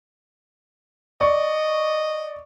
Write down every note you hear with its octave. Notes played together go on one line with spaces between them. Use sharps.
D5 D#5 C#6